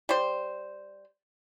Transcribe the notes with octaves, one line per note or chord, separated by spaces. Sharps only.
G3 C5